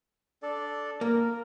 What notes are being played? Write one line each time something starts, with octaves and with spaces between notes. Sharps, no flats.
D4 A4 D5
A#3 A#4